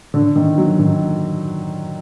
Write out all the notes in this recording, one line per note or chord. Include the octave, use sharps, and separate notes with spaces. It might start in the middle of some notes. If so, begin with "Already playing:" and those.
D3
D#3
F#3
D#3